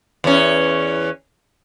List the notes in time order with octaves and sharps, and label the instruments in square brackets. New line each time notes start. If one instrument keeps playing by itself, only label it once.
[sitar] E2 C#4